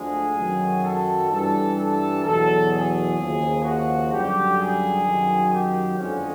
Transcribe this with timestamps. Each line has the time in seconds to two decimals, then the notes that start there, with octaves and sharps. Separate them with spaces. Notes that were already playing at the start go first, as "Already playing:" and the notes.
Already playing: D2 D3 F3 G#3 G#4
0.36 F#2 D#3 F#3
0.83 A4
1.30 G2 E3 G3 A4
1.76 A4
2.24 E2 B2 F#3 A4
2.70 G#4
3.17 D#2 C#3 F3
3.64 F#4
4.11 F#2 D3 G3 G4
4.58 G#4
5.04 F#2 D#3 F#3
5.51 G4
5.98 F2 D3 F3 G#3 C#4